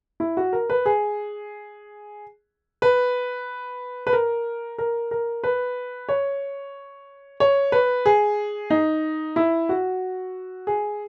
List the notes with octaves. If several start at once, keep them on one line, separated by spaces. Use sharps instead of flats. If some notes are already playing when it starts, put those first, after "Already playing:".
E4
F#4
A#4
B4
G#4
B4
B4
A#4
A#4
A#4
B4
C#5
C#5
B4
G#4
D#4
E4
F#4
G#4